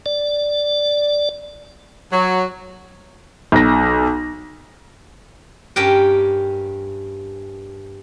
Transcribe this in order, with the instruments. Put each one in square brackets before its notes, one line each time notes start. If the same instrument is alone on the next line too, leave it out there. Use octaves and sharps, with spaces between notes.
[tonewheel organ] D5
[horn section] F#3
[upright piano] B1 A#6
[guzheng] G2 C#4 G4 A#4 G5